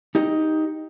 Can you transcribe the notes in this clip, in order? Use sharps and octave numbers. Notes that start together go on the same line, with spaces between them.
D#4 G4 D#5